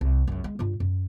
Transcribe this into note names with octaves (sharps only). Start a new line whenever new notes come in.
C2
C#2 F#2
G#3
G2 F4
F#2